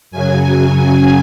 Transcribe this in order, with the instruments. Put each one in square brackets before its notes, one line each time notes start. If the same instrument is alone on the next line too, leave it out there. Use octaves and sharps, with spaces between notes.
[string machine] F#2 C#3 F#3 G#5